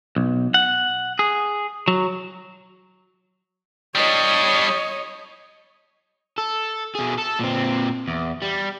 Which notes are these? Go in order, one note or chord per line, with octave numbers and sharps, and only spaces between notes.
B1
F#5
G#4
F#3
G3 D4 C#5 D#5
A4
B2 G#4
A4
A#2 C4
E2
G3